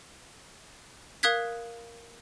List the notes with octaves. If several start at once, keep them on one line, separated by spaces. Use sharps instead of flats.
A#4 F5 D#6 F#6 G#6 B6